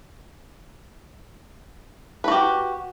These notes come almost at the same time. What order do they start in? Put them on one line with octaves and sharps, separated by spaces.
B4 F#4 G4